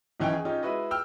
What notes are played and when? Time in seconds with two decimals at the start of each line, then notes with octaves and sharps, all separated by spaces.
0.20 B1 D#3 E3 C#4 C#5 G5
0.33 G#4
0.45 C#4 D#4 F4 G4
0.63 G#3 E4 F#4 B4 D#5
0.91 G5 E6 F6